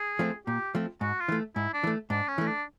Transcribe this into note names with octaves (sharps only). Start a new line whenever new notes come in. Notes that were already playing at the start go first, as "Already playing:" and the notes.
Already playing: G#4
F3 A3 C4
A#2 G4
F3 A3 C4
G#2 F#4
F4
E3 A3
G#2 E4
D4
E3 A3
G#2 D4
C#4
E3 A3
D4